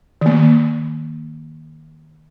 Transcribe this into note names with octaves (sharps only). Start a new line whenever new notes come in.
D#3 A#3